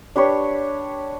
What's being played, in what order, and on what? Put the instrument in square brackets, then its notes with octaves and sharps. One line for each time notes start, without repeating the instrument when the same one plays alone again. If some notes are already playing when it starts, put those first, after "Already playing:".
[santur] D4 G4 B4 C#5